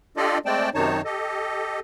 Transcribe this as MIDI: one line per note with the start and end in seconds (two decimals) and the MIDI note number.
0.17 0.38 62
0.17 0.38 65
0.17 0.38 67
0.17 0.38 69
0.17 0.38 74
0.17 0.38 75
0.46 0.70 56
0.46 0.70 57
0.46 0.70 60
0.46 0.70 74
0.46 0.70 79
0.46 0.70 81
0.74 1.02 42
0.74 1.02 48
0.74 1.02 51
0.74 1.02 63
0.74 1.02 73
0.74 1.02 81
1.05 1.80 67
1.05 1.80 69
1.05 1.80 75